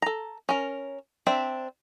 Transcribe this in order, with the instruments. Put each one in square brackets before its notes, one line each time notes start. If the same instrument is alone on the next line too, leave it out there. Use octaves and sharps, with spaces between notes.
[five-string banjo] A4 A#5
C#4 A#4
C4 D4 D5 E5